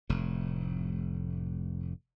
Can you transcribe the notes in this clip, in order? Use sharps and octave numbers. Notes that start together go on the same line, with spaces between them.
F1 A2